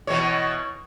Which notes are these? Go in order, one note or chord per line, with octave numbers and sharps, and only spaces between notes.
B2 E3 C#5